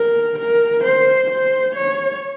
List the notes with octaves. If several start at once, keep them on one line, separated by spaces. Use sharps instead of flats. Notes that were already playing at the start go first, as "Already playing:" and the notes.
Already playing: A#4
A#4
C5
C5
C#5